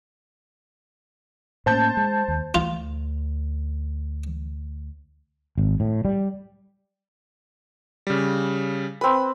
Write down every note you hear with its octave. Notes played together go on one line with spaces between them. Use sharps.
A2 A#3 C#4 C5 A5 G6
G#3
D#2
D2 F4
G#1
A2
G3
C#3 G3
C4 B4 B5